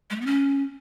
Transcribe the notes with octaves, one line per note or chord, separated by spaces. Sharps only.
G#3
A3
B3
C#4